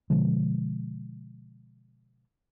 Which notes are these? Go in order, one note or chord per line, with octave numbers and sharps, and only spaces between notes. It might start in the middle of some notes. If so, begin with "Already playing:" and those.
B2 D3 F3 G#3